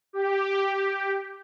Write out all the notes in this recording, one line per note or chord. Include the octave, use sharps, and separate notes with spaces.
G4